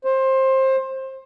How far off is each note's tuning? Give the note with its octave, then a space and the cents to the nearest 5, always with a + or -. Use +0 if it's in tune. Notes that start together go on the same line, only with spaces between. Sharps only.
C5 +20